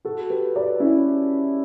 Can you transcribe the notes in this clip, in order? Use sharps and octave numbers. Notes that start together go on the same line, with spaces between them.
F#4 A4
G4 B4
B4 D5
C#4 E4